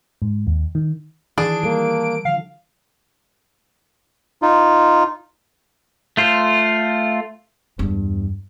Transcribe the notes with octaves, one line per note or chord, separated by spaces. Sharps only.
G#2
D#2
D#3
D#3 E3 D4 G#4 D7
G3 A#3 A4
D3 F3 F5
D#4 F4
A3 F4 C5
E2 G2